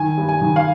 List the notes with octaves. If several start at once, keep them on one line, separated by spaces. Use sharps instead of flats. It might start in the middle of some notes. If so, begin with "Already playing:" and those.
Already playing: D#3 G#5
G2
G#5
D#3
F5